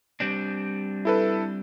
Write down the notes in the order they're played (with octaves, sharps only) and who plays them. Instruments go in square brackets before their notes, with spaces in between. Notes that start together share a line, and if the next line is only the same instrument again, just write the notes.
[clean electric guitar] G3 C4 D4
[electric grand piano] E4 A4 B4